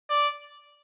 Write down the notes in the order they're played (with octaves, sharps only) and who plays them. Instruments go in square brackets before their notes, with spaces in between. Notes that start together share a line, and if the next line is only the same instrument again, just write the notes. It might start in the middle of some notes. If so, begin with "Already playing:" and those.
[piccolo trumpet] D5